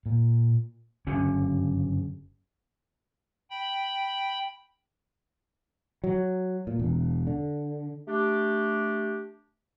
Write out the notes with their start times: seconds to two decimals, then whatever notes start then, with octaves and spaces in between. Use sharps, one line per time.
0.06 A#2
1.07 F#1 G2 D3 C#4
3.50 G5 B5
6.04 F#3
6.67 A#2
6.80 E1
7.27 D3
8.08 A3 D4 G4